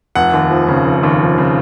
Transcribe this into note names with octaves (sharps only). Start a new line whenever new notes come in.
F1 F#5
D#2
F3
C#3
F1
D#2
F3
C#3